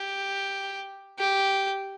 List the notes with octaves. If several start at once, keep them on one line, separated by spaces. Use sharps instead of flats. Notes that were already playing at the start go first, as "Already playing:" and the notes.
Already playing: G4
G4